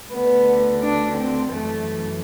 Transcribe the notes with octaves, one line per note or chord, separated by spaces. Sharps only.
D2 D3 B3
D4
C4
F#2 E3 A3